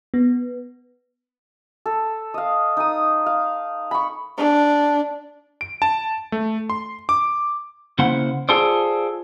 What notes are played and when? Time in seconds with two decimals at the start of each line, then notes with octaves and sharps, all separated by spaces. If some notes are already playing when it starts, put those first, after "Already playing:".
0.14 B3
1.86 A4
2.34 D#5 F5
2.77 D#4 D#6
3.26 F5
3.91 B5 C#6
4.37 D4
5.61 D7
5.82 A5
6.32 A3
6.70 C6
7.09 D6
7.99 C#3 A#3 E4 C5 F#5
8.49 F4 G#4 A4 C5 D5